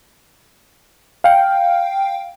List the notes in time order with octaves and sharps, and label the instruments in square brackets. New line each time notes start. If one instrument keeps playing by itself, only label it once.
[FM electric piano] F5 G5